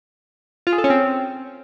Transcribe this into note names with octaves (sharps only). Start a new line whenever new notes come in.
F4
G#4
A4
C#4
C4